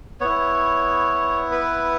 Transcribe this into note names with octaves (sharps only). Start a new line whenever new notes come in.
B3 E4 C#5
B4